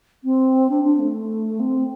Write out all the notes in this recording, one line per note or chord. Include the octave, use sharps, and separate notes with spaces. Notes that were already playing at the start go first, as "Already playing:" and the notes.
C4
D4
D4
A3
C4